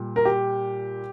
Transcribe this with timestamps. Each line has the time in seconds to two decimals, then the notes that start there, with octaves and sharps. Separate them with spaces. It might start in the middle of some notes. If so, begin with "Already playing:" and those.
Already playing: A#2 G3
0.16 A#4
0.25 G4